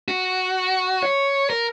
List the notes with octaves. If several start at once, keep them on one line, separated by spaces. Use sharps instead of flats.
F#4
C#5
A#4